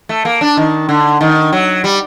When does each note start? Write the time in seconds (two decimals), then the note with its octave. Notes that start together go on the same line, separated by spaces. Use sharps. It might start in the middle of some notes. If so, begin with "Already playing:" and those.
0.09 A3
0.25 A#3
0.41 D4
0.57 D#3
0.89 D3
1.21 D#3
1.53 F#3
1.84 G3